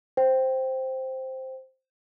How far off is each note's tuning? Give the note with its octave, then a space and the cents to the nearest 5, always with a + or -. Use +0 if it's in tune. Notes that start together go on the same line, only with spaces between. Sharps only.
C5 +0 G5 -10